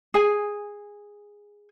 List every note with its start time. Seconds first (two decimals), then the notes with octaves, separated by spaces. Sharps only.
0.14 G#4 G#5